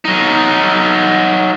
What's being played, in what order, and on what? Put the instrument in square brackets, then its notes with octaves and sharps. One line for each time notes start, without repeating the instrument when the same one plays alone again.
[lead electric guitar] F#3 D#4